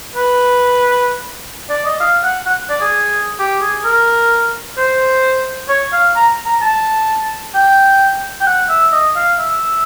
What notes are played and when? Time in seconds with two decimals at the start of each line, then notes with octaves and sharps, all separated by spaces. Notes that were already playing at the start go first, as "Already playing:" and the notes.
0.16 B4
1.70 D5
1.85 D#5
2.00 F5
2.24 F#5
2.46 F#5
2.69 D5
2.81 G#4
3.39 G4
3.62 G#4
3.85 A#4
4.78 C5
5.69 C#5
5.93 F5
6.16 A#5
6.46 A#5
6.62 A5
7.54 G5
8.41 G5
8.47 F#5
8.69 E5
8.92 D#5
9.16 F5
9.39 E5